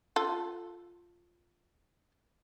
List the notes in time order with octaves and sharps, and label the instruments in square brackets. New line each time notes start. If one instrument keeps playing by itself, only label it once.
[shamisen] F4 A4